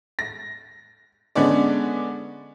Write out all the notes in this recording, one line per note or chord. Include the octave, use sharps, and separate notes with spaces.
A#6
D3 G#3 B3 C#4 D4 D5